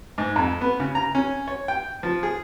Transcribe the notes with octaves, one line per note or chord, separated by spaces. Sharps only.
G#2
F2
B3
C#3
A#5
C#4
C#5
G5
F3
G#4